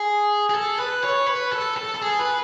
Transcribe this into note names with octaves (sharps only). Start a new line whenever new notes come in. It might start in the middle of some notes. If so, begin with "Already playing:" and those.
Already playing: G#4
G#4
A4
B4
C#5
B4
A4
A4
A4
G#4
B4